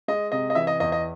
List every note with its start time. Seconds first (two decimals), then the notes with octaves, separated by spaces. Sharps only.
0.08 G#3 D#5
0.32 C3 D#5
0.50 D#5
0.55 E3 E5
0.67 D#5
0.80 E2 D#5
0.92 D#5